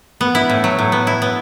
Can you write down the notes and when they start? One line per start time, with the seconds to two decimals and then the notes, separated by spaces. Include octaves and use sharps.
0.21 B3
0.35 E4
0.49 A2
0.64 F#3
0.79 A2
0.92 B3
1.07 E4
1.22 B3